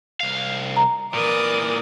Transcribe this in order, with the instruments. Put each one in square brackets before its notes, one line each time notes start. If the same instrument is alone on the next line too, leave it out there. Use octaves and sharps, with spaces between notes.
[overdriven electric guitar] C2 F5
[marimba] A#5
[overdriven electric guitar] A#2 E3 [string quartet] A#4 D5 D#6